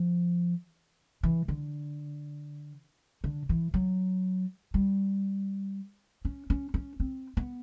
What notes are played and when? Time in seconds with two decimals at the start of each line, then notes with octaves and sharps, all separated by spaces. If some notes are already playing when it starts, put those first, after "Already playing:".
Already playing: F3
1.23 E3
1.48 D3
3.24 D3
3.49 E3
3.74 F#3
4.74 G3
6.25 C#4
6.50 C#4
6.74 C#4
7.00 C4
7.37 B3